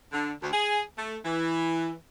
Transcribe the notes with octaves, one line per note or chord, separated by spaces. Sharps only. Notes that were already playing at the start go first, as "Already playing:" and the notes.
D3
D2
G#4
A3
E3